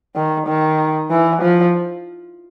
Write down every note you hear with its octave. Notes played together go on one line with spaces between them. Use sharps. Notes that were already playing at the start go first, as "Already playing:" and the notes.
D#3
D#3
E3
F3